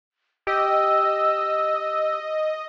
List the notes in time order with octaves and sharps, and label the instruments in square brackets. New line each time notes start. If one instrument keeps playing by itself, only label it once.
[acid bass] G4 [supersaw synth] D#5 [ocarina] E6